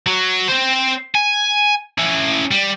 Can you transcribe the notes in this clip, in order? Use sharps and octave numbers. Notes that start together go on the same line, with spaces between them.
F#3
C4 C5
G#5
C#4 E4
G3